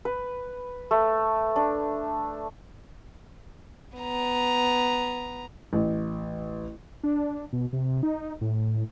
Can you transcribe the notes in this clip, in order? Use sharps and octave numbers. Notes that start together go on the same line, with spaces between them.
B4
A3
D4
B3 A#5
A1
D4
B2
C3
D#4
A2